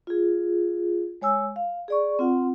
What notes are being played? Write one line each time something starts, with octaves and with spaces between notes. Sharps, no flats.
F4 G#4
G#3 C#5 G#5 E6
F5
G#4 D5 C#6
C4 F4 F#5